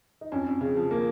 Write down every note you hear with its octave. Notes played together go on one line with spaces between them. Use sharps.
D#4
F2 C#4
F2
C#3
F3
A#3